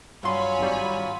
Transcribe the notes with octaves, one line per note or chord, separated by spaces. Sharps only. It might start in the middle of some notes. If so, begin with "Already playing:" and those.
G2 F#3 F4 C#5 G#5 B5 C6
G#1 G3